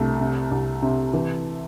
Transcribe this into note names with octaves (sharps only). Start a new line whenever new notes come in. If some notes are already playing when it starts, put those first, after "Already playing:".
Already playing: C2 A3
C3
C2
C3
E3